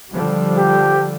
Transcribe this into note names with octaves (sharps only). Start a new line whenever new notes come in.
D3 F3 G3
G4